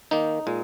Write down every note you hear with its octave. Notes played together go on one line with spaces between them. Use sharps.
D#3 A#3 D#4
A#2 G#3